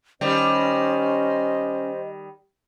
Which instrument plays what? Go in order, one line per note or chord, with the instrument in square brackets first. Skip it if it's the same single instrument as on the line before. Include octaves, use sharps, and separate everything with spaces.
[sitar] D#3 G3 [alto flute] C#4 [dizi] C5 [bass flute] D#5